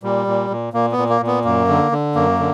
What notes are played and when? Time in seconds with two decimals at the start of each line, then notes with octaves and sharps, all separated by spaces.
0.03 A#2 G3
0.27 A#2
0.50 A#2
0.73 A#2 A#3
0.92 B3
0.98 A#2
1.09 A#3
1.21 A#2
1.27 B3
1.44 F#2 A#3
1.68 D3
1.92 D3
2.15 F#2 A#3
2.39 D3